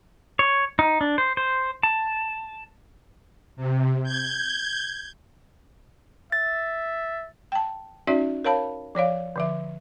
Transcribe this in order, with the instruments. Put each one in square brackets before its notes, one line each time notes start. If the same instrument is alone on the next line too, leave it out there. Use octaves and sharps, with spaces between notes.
[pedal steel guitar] C#5
D#4
D4
C5
C5
A5
[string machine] C3
G6 G#6
[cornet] E5 [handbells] A6
[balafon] G5 A5
C#4 D#4 F#4 D5 E5
A#4 C#5 F5 A5 B5
F3 C#5 D5 F5
D3 F3 E5